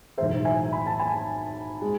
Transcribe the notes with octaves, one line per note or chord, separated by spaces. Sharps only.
B1 A2 E3 G#3 C5 E5
E5 G#5
B5
A5
G#5 B5
G#3